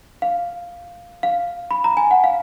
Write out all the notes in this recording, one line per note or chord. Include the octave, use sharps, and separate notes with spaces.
F5
F5
B5
A#5
G#5
F#5
F5